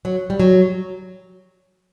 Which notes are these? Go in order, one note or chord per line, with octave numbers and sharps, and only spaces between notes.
F#3
G3
F#3